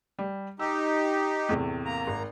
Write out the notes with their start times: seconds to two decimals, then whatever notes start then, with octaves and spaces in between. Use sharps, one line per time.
0.19 G3
0.59 D#4 G4 E6
1.49 E2 A2 C3
1.85 A#3 A#5
2.07 G#1